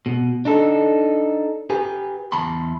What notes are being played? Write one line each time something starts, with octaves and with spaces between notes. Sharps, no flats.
B2
D4 D#4 A4
G4 B4 G#5
E2 A5 B5 C6